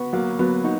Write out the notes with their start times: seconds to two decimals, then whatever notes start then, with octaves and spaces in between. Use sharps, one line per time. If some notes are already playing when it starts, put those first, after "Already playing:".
Already playing: B3 F#4
0.13 F#3 A#3
0.39 F#3 B3
0.64 D#4 F#4